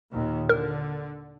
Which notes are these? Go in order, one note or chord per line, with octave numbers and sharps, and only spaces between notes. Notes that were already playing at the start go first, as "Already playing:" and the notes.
D#2 A#2 D#3
D3 A#4